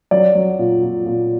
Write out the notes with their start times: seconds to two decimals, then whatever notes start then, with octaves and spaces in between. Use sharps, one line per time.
0.11 F#3 D5
0.35 F#3
0.59 A#2
0.83 A#2
1.06 A#2